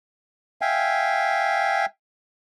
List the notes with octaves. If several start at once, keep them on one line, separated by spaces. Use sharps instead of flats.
E5 F5 G5 G#5